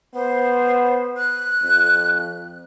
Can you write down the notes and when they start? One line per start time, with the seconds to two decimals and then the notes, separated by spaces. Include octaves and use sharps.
0.15 B3 C5
1.17 F#6
1.63 F2